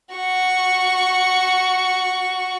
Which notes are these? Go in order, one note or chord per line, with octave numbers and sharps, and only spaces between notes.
F#4 C#6